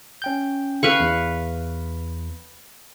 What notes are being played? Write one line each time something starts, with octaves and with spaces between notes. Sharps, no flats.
C#4 G5 G6
B4 F5 C#6
E2